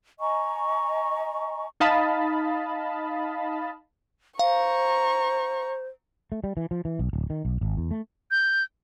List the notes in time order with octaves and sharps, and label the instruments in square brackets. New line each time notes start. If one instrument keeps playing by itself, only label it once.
[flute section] D#5 G#5 A#5 C#6
[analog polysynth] D#4 D#5 F5 A5 B5
[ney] C5 [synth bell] F5 [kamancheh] A#5 C#6
[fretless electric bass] A3
G3
E3
F3
E3
B1
D1
D#3
B1
G#1
E2
A3
[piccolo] G6